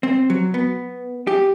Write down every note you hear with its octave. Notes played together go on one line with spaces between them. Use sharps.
C4
F#3
B3
G4